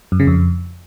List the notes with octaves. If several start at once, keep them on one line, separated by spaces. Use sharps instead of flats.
F#2
C#3
F2